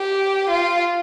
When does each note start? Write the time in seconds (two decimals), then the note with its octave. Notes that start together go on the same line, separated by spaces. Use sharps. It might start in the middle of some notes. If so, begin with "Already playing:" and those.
Already playing: G4
0.50 F4